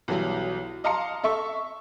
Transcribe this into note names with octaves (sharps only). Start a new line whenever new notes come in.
B1 E3 F#3 G3
D#5 F5 A5 A#5 C6 C#7
A4 E5 C#6